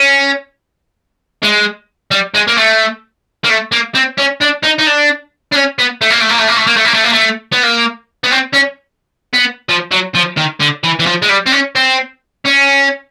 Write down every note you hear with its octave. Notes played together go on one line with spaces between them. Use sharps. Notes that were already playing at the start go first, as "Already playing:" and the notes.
Already playing: C#4
G#3
G3
G#3
A#3
A3
A#3
A3
A#3
C4
C#4
D4
D#4
D#4
D4
D4
C#4
B3
A3
A#3
A3
A#3
A3
A#3
A3
A#3
A3
A#3
A3
A#3
A3
B3
A#3
B3
C4
C#4
B3
F3
F#3
F3
D#3
D3
E3
E3
F3
G#3
G3
C4
C#4
C4
C#4